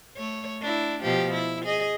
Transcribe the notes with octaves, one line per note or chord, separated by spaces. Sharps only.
A3 C#5
D4 E4
B2 F3 G4
E4
G#4 D#5